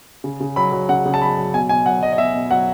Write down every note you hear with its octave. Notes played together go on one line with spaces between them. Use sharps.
C#3
C#3
F#3 B5
F#3
C#3 F#5
C#3
A5
F#3 B5
F#3
B2 G#5
B2 G#5
F#3 F#5
F#3 D#5
D#5
B2 E5
B2
F#3 F#5